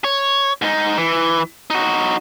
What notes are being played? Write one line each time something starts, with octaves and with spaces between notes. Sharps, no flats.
C#5
G#2 D#4
E3
D#4 F#4